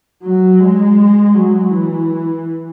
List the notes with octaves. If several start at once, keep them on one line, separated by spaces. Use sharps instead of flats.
F#3
G#3
F#3
E3